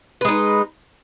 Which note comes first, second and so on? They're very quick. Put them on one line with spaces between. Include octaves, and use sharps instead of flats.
B4 G#3 D#4